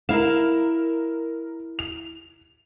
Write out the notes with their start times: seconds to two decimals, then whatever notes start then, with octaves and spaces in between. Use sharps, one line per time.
0.09 E4 A#4 F5 E7
1.79 F7